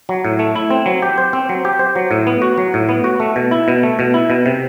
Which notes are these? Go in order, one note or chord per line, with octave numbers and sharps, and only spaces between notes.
F#3
A2
A3
E4
C4
F#3
G4
C5
C4
F#3
G4
C5
F#3
A2
B3
F#4
F#3
A2
B3
F#4
A3
B2
E4
B2
A3
B2
E4
B2
C3